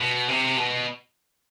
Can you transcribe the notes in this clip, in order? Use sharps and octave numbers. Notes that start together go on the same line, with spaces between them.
B2
C3
B2